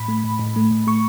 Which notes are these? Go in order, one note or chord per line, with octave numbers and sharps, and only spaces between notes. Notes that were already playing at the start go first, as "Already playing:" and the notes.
Already playing: A2 B5
A3
A2
A2
A3
A2
A3 C#6